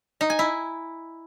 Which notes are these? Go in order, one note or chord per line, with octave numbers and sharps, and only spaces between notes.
D#4
G#5
E4